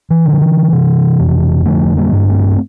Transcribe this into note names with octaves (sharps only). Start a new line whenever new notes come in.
E3
D3
F3
E3
C3
F2
D3 F3 A3
G3 A#3
G2
A3 C4